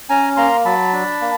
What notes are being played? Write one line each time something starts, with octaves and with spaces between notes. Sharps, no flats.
C#4 G#5 A#5
A#3 A#5 C6
F#3 A5 B5
D4
A#3